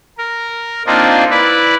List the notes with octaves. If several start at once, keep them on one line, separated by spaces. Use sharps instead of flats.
A#4
A#3 C4 D4 D#4 F4
E4 B4 D5